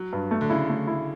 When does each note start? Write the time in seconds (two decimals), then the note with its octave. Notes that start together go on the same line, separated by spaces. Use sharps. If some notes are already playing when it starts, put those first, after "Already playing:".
Already playing: F#3
0.13 G2
0.31 A3
0.41 D3
0.50 C#3 E4
0.69 A3
0.87 E4